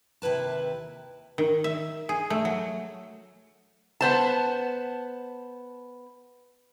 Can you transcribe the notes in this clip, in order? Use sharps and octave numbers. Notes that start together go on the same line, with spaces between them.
D#2 C3 E4 B4 A5
D#3
E5
G#4
A3
F#3
B3 C5 A5